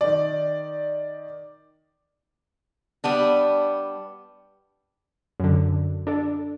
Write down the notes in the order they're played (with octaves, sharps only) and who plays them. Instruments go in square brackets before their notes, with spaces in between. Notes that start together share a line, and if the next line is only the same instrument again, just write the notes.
[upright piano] D#3 D5
[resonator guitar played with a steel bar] G3 B3 D4
[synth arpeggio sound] F#2 D3
D4 A4 D5